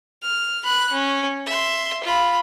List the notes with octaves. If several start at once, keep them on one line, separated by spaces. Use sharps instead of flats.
F6
B5 F#6
C#4
E5 C6
F4 B5